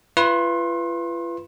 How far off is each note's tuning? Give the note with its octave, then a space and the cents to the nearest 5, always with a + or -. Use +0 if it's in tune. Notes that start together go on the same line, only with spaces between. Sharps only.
F4 -40 B4 +0 C6 +35